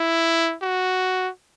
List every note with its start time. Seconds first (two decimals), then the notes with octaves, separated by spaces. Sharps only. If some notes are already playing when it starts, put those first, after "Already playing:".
Already playing: E4
0.62 F#4